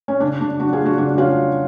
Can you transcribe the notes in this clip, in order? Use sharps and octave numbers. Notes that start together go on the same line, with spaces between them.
C#4
C#3 D4
C#3 D4
F#3 D4 F#4
F4 G#4
A3
D4 F#4
C#3 D4
C#3 C#4 F4
F#3